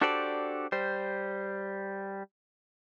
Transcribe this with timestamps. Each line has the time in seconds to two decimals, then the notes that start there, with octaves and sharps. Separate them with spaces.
0.01 D4 F#4 G4 A4 C5 D5
0.72 G3 C5